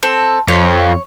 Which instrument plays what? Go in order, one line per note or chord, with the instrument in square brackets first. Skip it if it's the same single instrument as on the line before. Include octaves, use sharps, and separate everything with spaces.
[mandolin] C4 A4
[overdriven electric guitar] F2 [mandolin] C#5